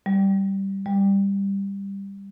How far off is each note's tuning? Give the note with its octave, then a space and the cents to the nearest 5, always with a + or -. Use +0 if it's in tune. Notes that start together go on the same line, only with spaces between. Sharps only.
G3 -10
G3 +15